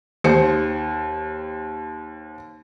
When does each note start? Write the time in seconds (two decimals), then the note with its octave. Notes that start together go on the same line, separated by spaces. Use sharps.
0.24 D#2 C5 C#7